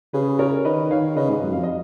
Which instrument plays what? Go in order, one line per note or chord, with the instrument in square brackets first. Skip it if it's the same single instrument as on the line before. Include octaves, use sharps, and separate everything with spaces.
[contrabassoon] C#3 [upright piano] G#4 B4
[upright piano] A#4 C#5
[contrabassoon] D#3 [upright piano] B4 D#5
[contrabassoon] D#3 [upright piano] C#5 F5
[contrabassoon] C#3 [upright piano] B4 D#5
[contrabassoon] G#2
F#2
[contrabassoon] F2 [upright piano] F5
[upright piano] D#5